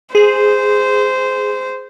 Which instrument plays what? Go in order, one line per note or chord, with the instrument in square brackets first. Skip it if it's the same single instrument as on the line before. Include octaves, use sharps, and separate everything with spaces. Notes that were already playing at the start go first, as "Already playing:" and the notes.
[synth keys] G#4 [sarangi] C5